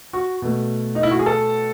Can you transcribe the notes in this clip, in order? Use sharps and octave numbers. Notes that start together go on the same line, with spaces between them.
F#4
B2 A3
D#4
E4
F#4
G#4
A4